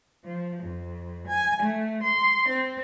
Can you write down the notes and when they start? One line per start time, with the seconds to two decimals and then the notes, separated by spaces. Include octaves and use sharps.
0.25 F3
0.63 F2
1.27 G#5
1.62 A3
2.02 C6
2.48 C4